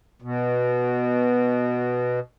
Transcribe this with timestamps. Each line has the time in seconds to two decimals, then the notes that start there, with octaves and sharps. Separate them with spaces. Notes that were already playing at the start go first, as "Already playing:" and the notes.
0.22 B2